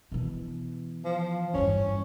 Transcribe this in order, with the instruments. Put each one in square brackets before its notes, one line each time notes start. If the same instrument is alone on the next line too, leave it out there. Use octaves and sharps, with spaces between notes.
[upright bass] B2 E3
[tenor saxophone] F3
[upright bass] E2 G2 [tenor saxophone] C#4